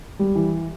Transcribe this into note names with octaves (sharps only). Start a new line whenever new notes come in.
G3
E3